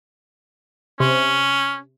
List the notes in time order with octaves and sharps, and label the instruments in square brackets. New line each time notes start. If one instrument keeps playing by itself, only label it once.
[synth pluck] C3 [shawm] C#4